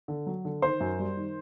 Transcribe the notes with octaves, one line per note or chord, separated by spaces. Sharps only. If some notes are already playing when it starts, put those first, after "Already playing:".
D3
F#3
D3
D#3 C5 C6
F#2
G3
D#3